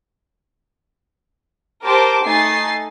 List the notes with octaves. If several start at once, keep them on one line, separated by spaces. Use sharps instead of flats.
G4 A#4 C5 A5 D6
A3 D#4 G#5 A6 C7